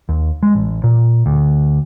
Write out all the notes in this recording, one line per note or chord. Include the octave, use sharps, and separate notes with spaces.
D#2
G#3
A1
A#2
D2